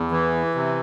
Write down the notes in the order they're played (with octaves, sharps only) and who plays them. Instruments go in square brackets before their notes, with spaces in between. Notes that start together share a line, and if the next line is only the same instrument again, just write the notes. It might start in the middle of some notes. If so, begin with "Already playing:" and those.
Already playing: [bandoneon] E2
E3
C3